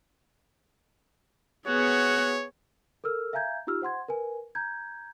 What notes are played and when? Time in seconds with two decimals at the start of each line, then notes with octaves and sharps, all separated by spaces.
1.68 B3 F#4 G#4 C#5
3.04 A4 A#4 E6 F6
3.33 E5 F5 G#5 A#5 G6 G#6
3.67 D#4 F4 G4 E6 F6
3.82 C5 F#5 C6 G#6
4.08 A#4 B4 G#5
4.55 A#5 G6 G#6